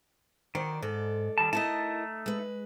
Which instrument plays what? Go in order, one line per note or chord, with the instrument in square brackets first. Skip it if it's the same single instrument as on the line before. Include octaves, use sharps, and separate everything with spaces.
[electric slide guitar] D#3 [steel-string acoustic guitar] F#3 C5 D5
[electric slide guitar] G#2 [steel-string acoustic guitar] A4 D5
[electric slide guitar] D#3 G3 A5
[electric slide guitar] A3 D#4 A5 [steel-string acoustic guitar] E4 A#4 D#5
[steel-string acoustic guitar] G#3 B4